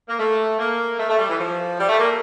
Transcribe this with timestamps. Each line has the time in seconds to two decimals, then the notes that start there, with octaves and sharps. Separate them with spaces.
0.09 A#3
0.19 A3
0.59 A#3
0.99 A3
1.09 A3
1.19 G3
1.29 E3
1.39 F3
1.79 G3
1.89 A3
1.99 A#3